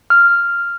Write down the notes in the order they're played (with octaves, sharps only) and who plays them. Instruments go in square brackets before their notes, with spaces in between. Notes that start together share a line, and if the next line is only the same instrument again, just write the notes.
[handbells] F6